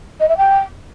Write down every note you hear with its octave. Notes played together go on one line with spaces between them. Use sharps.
D#5
E5
G5